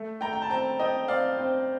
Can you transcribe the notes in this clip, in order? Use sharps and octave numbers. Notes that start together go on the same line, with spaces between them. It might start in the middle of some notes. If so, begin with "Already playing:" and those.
Already playing: A3
A3 G5 A#5
G5
A5
C4 G5 A#5
C4 D#5 G5
C4 D5 F5
C4